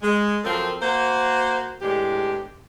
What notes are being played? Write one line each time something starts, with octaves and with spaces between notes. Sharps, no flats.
G#3
F#2 F3 C4 F4 A4 A#4
A#3 F#4 C5
E2 A2 G#3 D4 G4